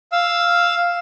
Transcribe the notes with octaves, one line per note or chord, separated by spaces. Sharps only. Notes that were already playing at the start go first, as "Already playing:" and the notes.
F5 E6